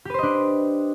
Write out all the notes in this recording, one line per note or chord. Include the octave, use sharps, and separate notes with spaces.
D4 G4 B4 C5 D#5